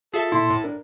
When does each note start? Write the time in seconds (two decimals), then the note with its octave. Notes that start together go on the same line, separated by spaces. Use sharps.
0.14 F4 G#4 A4 E5
0.32 A#2 E4 C6
0.50 A2
0.64 D4 A#4